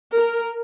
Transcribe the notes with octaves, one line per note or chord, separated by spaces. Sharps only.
A#4